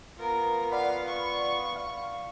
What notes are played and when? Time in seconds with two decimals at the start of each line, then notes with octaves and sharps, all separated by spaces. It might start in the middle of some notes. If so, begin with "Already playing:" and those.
0.18 B3 F4 A#4
0.72 D5 F5 F#5 B5
1.08 C#6
1.76 F5